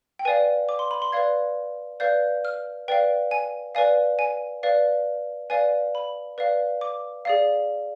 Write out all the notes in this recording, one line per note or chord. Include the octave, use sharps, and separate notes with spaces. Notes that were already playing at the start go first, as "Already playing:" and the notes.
G5
B4 D5 F5 G#5
D6
C6
B5
C6
B4 D5 F5 G#6
B4 D5 F5 G6
F6
B4 D5 F5 G5
G#5
B4 D5 F5 G#5
G#5
B4 D5 F5
B4 D5 F5 G#5
B5
B4 D5 F5
D6
G#4 D5 F5